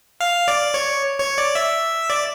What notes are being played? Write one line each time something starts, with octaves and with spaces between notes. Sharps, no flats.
F5
D5
C#5
C#5
D5
E5
D5